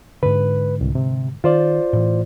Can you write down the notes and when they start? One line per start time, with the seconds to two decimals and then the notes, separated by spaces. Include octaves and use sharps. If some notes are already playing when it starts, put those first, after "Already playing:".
0.23 G#2 D3 B4
0.81 C2
0.95 C3
1.44 D#3 F4 C5 D5
1.93 A2 E3